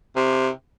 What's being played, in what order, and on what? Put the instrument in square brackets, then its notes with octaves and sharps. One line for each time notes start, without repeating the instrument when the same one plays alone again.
[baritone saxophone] C3